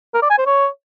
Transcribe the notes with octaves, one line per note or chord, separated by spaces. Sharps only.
A#4
D5
G#5
C5
C#5